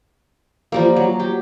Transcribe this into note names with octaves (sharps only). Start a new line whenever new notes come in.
F3 G3 A#3
F#3
G4